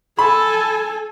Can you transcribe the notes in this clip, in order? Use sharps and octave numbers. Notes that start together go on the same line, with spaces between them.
A4 G#5 B5